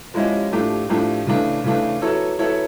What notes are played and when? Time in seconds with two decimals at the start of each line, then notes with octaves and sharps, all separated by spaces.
0.14 F3 G#3 C#4 E4 G4
0.52 A2 F3 A3 D4 G4
0.89 A2 F3 A3 D4 G4
1.27 C#3 E3 A3 D4
1.64 C#3 E3 A3 D4
2.01 F#3 B3 E4 A4 C#5
2.39 F#3 B3 E4 A4 C#5